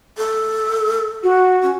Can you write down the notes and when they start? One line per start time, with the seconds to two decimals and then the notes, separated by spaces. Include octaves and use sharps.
0.18 A4
1.23 F#4
1.62 C#4